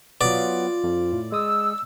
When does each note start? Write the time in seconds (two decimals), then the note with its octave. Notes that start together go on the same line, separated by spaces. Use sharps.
0.21 F#3 B3 F4 D5
0.84 F2
1.13 A2
1.32 G#3 D#6 E6